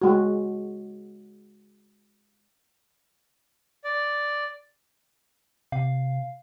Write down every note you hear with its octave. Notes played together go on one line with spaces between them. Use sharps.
G#3 F#4
D5
C3 F5